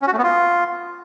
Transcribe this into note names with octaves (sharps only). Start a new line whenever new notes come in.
C#4
F#4
A3
B3
F4